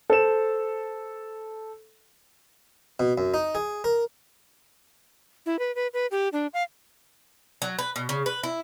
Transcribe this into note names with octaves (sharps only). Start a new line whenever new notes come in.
A4 C5 E7
B2
F#2
D#4
G#4
A#4
E4
B4
B4
B4
G4
D4
F5
F#3
B4
B2
C#3
B4
E4